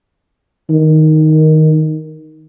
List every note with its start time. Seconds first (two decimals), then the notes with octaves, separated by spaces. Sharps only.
0.70 D#3